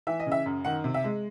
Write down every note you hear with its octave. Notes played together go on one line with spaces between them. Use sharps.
E3 E5
D#5
C#3
E5
F#2
D#3 F#5
C3
E5
G#3